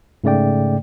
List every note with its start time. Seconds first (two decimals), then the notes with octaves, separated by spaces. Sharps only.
0.24 G#2 C#3 A3 D5 G5